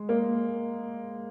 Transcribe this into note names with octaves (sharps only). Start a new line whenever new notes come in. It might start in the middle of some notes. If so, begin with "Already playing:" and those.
Already playing: G#3
A#3